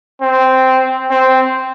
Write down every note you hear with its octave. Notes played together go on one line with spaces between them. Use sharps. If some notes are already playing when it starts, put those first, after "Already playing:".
C4
C4